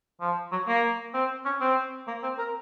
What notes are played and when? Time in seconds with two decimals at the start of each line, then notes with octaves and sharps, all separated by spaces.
0.21 F3
0.52 F#3
0.68 A#3
1.14 C4
1.45 C#4
1.61 C4
2.08 A#3
2.23 C4
2.39 A#4